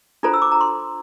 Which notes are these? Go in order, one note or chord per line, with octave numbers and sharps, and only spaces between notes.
D4 F4 A4 C5 A#5
E6
D6
A#5
C6